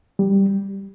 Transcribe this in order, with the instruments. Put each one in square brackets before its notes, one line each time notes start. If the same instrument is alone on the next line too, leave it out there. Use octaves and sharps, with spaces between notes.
[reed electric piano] G3